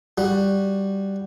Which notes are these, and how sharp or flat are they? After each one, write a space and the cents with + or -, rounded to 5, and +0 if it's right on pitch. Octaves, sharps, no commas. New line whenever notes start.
G3 +0 F#4 +0